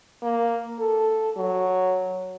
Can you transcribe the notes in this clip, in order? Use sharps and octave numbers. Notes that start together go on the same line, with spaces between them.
A#3
A4
F#3